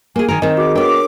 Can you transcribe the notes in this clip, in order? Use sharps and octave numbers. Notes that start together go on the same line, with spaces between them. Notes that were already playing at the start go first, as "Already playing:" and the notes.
A#3 G#4 G#5
D#3 A#4 G#5
D#3 C4 D#5
F#4 G#4 D6
B3 D4 A#4 C#5 G5 D6